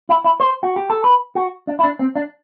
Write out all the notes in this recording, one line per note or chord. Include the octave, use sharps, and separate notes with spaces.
E4
E4
C5
F#4
G4
A4
B4
F#4
D4
E4
D4
C4
D4